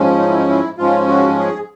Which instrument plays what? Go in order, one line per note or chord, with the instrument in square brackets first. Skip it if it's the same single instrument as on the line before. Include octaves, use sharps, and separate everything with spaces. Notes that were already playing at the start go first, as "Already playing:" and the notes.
Already playing: [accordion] G#2 F3 G#3 C#4
D#4
E4
D#4
E4
G#2 F3 G#3 C#4 F4
F#4
G#4